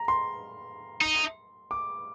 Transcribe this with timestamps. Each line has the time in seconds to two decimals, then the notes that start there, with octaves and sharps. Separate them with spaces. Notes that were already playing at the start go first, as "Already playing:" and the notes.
Already playing: A#5
0.08 C6
1.01 D#4
1.71 D6